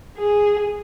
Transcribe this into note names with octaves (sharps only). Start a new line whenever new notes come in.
G#4